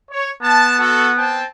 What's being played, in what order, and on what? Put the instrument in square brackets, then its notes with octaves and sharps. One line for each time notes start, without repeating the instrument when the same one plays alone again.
[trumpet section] C#5
[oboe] B3 [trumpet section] A5
[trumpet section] F#4 A4
C4 G5 A5